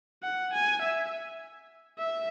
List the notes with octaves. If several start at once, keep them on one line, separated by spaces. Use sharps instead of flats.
F#5
G#5
E5
E5